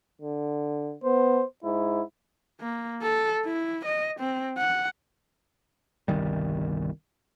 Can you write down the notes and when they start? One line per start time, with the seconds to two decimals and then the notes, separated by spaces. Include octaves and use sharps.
0.22 D3
1.04 B3 C5
1.64 G#2 E4
2.61 A#3
3.02 A4
3.46 E4
3.85 D#5
4.20 C4
4.58 F#5
6.08 G1 C2 D#3 G3